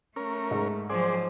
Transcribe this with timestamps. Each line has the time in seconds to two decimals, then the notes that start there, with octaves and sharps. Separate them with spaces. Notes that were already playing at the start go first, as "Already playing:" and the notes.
0.16 A3 C#4 A#4
0.51 G#2
0.90 F3 F#3 G#4 C5 D5